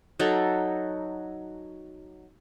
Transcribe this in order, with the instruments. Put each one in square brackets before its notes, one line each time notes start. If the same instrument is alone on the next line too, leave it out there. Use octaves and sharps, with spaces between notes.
[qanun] F#3 D#4 A4